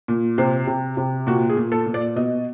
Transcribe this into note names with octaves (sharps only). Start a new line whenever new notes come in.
A#2
C3 C5
C3
C3
A#2 F#4
G#4
A#2
A4
A#2
D5
B2 D#5